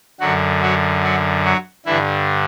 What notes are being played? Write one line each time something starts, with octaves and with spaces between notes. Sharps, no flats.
F#2 D3 F#3 F#4
F#3 F#4
F#3 F#4
F#3 F#4
G2 D3 E3 E4